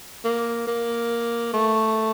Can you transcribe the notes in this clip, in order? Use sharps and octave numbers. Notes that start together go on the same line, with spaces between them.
A#3
A#3
A3